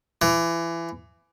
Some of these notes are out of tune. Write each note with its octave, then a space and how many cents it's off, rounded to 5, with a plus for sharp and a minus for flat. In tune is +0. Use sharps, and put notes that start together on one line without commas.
E3 +25